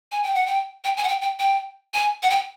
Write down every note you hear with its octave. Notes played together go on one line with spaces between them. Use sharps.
G#5
G5
F#5
G5
G5
G#5
F#5
G5
G5
G5
G#5
F#5
G5